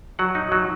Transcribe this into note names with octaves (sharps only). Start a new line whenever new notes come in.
F#3 F#5
D#4
F#3